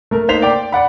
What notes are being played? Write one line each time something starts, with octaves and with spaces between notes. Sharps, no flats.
A3 A#4
A#3 D#4 C5 B6 F7
D5 G5 D6
D5 F#5 B5